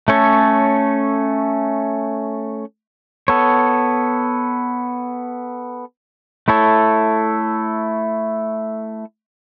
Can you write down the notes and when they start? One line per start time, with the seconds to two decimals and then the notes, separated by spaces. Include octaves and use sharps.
0.08 A3 C#4 A4 C#5
3.28 B3 A4 C#5
6.48 A3 E4 A4 C#5